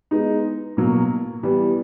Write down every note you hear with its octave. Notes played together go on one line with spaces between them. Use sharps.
G#3 B3 D#4
B2 F#3 A#3
E3 G3 B3